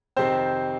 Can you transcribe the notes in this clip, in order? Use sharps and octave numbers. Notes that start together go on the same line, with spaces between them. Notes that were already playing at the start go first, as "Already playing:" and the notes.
F2 C3 D#3 C4 C5